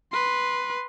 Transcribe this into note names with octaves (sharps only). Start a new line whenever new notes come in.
B4 C6